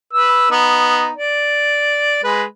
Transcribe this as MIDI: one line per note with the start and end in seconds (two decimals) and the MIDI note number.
0.13 0.47 71
0.13 0.47 88
0.50 1.09 59
0.50 1.09 63
1.16 2.20 74
2.24 2.44 56
2.24 2.44 71